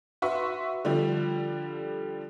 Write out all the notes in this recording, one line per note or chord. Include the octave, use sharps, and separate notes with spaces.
F#4 B4 E5 C6 C#6
D3 F3 G3